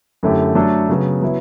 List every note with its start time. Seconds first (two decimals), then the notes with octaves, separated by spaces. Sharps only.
0.23 F#2 D3 A3 E4 G4
0.55 F#3 A3 D4 A4
0.89 C#3 F#3 B3
1.22 F#3 B3 E4